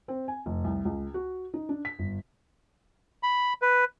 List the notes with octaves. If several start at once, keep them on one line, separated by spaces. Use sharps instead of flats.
C4
G#5
F1
C2
C#2
F#4
D#4
D4
B6
G1
B5
B4